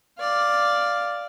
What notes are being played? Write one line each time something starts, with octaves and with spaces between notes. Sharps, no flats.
D5 F5